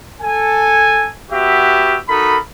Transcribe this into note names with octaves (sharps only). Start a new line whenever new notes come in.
A4 G#5
B3 F#4 G4 E5
D#4 F#4 A4 A#4 B5